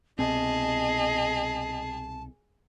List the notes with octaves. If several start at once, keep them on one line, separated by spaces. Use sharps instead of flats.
C2 B2 C4 G#4 D#5 A5